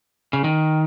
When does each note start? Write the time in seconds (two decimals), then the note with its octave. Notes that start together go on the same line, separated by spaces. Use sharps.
0.33 C#3
0.44 D#3